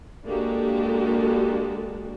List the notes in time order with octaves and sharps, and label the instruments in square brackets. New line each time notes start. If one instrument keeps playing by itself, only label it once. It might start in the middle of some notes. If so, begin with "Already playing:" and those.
[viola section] G#3 A#3 D4 F#4 G4 A4